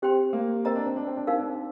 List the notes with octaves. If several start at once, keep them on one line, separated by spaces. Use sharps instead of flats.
C4 G4 C5 G5 C6
A#3
C4 A#4 D#5 A#5
D4
C4
D4
C4
D4
C4 D#4 A#4 F5
D4
C4